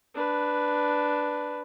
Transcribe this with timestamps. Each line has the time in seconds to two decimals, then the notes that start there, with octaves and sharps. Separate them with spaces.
0.15 D4 B4